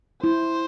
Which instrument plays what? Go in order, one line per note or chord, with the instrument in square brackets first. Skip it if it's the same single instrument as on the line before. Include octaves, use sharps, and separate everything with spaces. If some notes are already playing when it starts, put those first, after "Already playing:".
[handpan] E4 [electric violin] C5